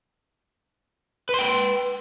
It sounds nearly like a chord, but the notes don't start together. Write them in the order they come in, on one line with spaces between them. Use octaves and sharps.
B4 C6 G5